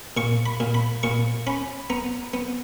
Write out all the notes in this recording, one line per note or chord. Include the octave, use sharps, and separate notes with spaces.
A#2 C#6
B5
A#2
B5
A#2 C#6
C#4 B5
B3 A#5
B3